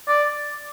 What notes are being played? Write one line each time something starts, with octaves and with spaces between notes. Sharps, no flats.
D5